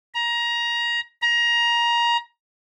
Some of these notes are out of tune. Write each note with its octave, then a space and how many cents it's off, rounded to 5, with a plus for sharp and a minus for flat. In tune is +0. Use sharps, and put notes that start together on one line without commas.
A#5 +20
A#5 +20